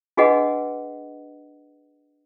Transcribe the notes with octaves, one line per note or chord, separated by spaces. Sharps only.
D4 F#4 G#4 B4 D#5 F#5